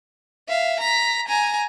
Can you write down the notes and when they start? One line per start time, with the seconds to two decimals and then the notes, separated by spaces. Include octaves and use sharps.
0.48 E5 F5
0.80 A#5 B6
1.28 G#5 A#5